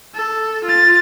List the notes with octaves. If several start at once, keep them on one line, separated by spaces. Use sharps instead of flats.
A4
F4 A6